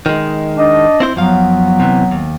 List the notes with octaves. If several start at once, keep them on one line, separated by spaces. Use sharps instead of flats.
D#3 G#3
D4 D#5
C4 E4 C5
F#2 F3 F#3 B3 F5
C3 E3
D#2